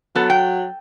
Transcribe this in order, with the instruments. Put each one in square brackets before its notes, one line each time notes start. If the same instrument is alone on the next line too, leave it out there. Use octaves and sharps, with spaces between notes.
[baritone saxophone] F#3 [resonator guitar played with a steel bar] B3 A4
[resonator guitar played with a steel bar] G5